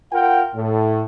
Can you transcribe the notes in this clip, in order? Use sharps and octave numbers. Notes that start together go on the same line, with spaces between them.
F4 A#4 F#5 G5
A2